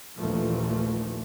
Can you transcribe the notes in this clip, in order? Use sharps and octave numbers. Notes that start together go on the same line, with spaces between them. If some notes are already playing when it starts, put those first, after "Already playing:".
A#1 D#2 A#2 E3 F3 A3